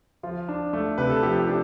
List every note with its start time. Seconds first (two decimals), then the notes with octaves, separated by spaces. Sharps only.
0.23 F3 F4
0.49 D4
0.73 A3
0.98 C3 B4
1.10 A4
1.23 F3 G4
1.39 G4
1.47 D4